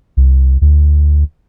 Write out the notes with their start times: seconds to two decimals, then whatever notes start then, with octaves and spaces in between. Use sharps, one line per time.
0.17 C2
0.61 D2